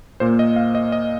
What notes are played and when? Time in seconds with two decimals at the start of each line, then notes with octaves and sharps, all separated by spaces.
0.20 A#2 A#3 C5
0.39 D#5
0.56 F5
0.75 D#5
0.92 D#5